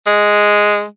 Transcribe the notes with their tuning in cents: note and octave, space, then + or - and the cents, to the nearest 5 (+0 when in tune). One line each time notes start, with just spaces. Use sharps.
G#3 +0